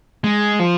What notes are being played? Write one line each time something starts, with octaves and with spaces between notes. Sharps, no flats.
G#3
F3